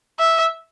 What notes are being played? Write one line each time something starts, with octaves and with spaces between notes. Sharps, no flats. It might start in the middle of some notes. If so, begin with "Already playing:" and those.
E5